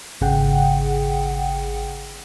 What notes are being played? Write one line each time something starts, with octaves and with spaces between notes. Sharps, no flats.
G#1 C#3 G#4 F#5 G5